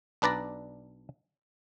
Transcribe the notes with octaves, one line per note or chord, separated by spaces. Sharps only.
B1 D4 B4 D5 A#5